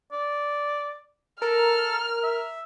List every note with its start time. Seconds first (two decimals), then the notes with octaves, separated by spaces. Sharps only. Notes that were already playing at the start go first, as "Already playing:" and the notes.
0.12 D5
1.42 A4 A#4 F6
2.23 E5